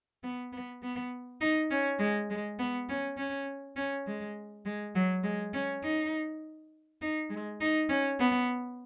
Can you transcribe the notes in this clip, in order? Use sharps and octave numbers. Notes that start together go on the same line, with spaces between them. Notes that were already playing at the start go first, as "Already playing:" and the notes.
B3
B3
B3
D#4
C#4
G#3
G#3
B3
C#4
C#4
C#4
G#3
G#3
F#3
G#3
C#4
D#4
D#4
G#3
D#4
C#4
B3